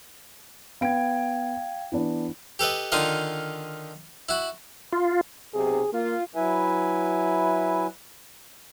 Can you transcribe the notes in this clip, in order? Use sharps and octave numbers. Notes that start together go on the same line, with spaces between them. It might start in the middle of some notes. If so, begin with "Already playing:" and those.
B3 F5 G5 G#6 D7
E3 B3 D4
G4 A4 B4 D#5
D3 D#3 D#4 F4 D#5
E4 F#4
F4
B1 C3 G#4
A#3 F4
F#3 E4 B4 E5 G#5